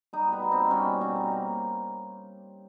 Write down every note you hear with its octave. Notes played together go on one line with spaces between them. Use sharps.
G3 D#4
B2 B3
B2
C4
A#3
G3 C#4
B2
B2 C4
A#3